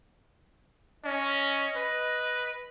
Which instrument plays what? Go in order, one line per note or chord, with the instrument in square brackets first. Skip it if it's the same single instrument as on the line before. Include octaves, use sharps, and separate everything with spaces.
[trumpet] C#4 [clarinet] D#5
[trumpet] B4